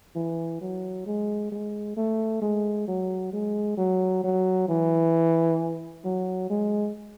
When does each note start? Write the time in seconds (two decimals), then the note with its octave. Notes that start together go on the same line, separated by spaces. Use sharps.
0.15 E3
0.61 F#3
1.06 G#3
1.52 G#3
1.97 A3
2.42 G#3
2.88 F#3
3.33 G#3
3.77 F#3
4.24 F#3
4.68 E3
6.04 F#3
6.50 G#3